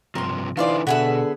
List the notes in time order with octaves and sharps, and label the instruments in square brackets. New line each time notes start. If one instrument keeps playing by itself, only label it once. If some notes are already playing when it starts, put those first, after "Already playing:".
[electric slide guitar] G2 C3 F3 [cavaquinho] A#4 C6
[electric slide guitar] D3 D4 D#4 [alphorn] E3 [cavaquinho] F4 C5 D5
[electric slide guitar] B2 [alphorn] D3 [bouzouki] B3 G#4 E5 [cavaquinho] F#5